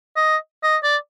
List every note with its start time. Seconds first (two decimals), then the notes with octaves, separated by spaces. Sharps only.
0.16 D#5
0.63 D#5
0.83 D5